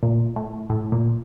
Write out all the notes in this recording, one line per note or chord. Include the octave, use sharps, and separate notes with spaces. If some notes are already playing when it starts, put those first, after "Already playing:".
A#2
A2
A2
A#2